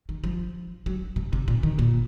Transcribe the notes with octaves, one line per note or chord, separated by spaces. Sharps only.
D#3
F3
F#3
C3
C3
A#2
D#3
A#2